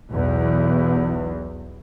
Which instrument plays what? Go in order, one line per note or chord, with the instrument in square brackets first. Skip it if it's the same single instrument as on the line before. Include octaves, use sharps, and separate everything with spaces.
[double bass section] B1 E2